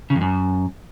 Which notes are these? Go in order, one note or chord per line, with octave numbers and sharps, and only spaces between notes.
C#3
F2
F#2